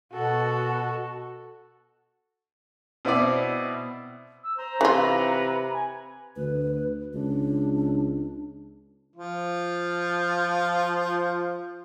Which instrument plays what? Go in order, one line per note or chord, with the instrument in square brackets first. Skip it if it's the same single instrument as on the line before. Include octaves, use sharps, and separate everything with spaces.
[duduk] B2 [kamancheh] F#4 A4
[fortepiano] B2 C4 E4 D5
[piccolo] E6
[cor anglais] C5 [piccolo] A#5
[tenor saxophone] C3 [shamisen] E3 F4 [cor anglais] B4
[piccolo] G#5
[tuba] D2 [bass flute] B4
[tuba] C#2 [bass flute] D4
[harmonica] F3 F4